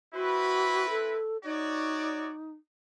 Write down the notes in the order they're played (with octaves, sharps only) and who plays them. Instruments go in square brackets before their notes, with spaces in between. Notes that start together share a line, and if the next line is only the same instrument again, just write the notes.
[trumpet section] C4 E4 B4 [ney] F#4
[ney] A4
[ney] D#4 [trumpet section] F#4 C#5 D5